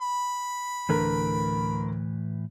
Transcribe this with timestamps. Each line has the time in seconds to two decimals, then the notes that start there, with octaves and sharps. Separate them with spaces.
0.01 B5
0.89 D2 A2 D3 E3 A#4 B4